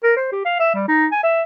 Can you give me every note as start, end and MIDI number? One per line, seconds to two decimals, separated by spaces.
0.03 0.15 70
0.16 0.27 72
0.32 0.44 67
0.45 0.58 77
0.60 0.71 76
0.75 0.87 55
0.88 1.06 63
1.12 1.22 80
1.23 1.42 76